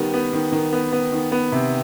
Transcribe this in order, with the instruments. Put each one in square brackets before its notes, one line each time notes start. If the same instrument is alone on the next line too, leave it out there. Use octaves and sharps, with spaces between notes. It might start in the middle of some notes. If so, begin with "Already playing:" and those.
Already playing: [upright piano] D#3 G3 B3
B3
D#3
D#3
B3
B3
D#3
B3
C3